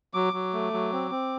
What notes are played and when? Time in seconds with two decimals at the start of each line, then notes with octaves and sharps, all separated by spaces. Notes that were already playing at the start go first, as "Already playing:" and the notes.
0.14 F#3 D6
0.33 F#3
0.53 A3
0.73 F#3
0.93 C4
1.11 C4